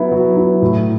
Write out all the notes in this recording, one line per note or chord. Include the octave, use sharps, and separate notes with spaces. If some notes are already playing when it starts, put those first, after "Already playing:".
Already playing: F#3 B3 E4
F#3
B3 E4
A2